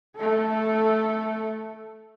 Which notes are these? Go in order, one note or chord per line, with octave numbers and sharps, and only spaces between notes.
A3 A4